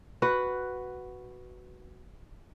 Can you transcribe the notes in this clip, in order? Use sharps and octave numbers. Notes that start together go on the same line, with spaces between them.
F#4 B4